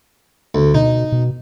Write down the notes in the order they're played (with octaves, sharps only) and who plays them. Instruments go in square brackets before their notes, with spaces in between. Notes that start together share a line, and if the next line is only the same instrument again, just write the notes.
[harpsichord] D2
[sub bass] B2 [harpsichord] D#4
[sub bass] B2